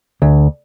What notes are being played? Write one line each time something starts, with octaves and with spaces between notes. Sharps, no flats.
D2